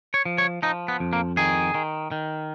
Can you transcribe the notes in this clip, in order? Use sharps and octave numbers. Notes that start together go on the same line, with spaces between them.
C#5
F3
C#5
F3 D#4
B3
F2
A#3
D#3 G#4
D#3
D#3